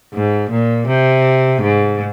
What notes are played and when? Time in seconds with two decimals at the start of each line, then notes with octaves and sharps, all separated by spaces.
0.14 G#2
0.50 A#2
0.87 C3
1.61 G#2